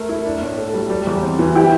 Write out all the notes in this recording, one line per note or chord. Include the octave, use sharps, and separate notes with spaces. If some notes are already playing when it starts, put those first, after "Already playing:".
Already playing: A3 A#4 E5
E4
D4
A2
A4
G3
G3
E2
C4
E3
E4 G4